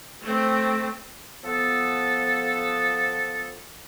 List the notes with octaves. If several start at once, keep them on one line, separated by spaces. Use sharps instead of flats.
A3 C4
F3 B3 A4